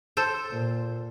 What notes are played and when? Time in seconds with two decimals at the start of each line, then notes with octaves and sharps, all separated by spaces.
0.17 A4 C5
0.51 A#2